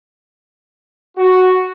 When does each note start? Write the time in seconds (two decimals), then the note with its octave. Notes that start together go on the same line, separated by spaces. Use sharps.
1.18 F#4